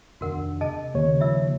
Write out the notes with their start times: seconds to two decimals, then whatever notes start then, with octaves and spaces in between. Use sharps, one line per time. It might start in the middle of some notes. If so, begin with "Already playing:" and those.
0.21 F1 D#2 D4 F#4 A#4 F#5
0.61 C3 G#4 D#5 A5
0.94 D#2 C#3 C#5
1.20 F3 A#3 F4 E5 E6